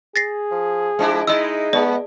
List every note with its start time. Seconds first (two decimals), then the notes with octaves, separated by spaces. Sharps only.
0.16 G#4 A6 A#6 C7
0.51 F3
0.99 F3 G#3 D4 E4
1.27 G#3 D#4 E4 D#5 E6
1.73 G#3 B3 D5